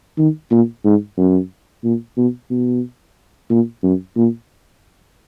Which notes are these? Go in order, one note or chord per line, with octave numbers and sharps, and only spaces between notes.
D#3
A#2
G#2
F#2
A#2
B2
B2
A#2
F#2
A#2